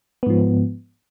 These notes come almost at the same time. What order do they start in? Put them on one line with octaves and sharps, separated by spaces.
B3 G#2 F3